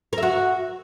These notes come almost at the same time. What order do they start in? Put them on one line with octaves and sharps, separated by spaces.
A#4 E5 F#4